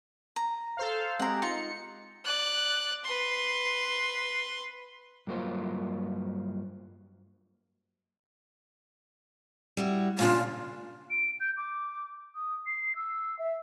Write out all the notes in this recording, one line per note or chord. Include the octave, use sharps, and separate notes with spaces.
A#5
A4 C5 F5
G#3 C4 G4 F#5 A#5
D#4 F4 C#7
D5 F#6
B4 C6
G2 F#3 A#3 F4 C5
G3 E4 F#4
A#2 C#3 D4 F4
D7
G6
D6
D#6
C7
E6
E5